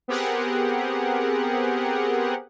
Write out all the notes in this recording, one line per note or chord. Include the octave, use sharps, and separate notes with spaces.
B3 C4 G4 G#4 A#4 F#5